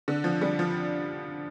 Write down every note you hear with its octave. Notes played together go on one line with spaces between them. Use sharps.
D3
F3
D3 G3
F3